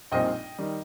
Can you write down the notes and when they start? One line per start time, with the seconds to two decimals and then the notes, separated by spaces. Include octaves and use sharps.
0.12 A#1 A#2 G3 C4 D#4 D#5 G5
0.58 D#3 G3